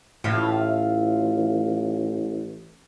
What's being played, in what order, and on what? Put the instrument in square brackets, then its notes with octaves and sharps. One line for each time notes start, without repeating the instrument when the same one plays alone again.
[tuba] A1 [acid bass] A2 [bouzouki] F4 E5 F5